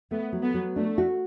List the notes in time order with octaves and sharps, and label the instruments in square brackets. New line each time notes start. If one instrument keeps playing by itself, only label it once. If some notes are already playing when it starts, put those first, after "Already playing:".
[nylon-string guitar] A3 [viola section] B3
[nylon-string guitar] F#3
[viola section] B3
[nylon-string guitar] F#3
[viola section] A3 [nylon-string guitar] D4
[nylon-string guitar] F#4